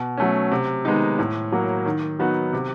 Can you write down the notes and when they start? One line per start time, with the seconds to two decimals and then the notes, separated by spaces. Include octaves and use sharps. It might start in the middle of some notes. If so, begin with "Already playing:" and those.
Already playing: B2
0.18 F#3 A3 C#4
0.52 C3
0.85 D#3 G#3 B3 D#4
1.19 A2
1.52 F#3 A#3
1.86 D#3
2.19 F#3 B3 D#4 F#4
2.53 C3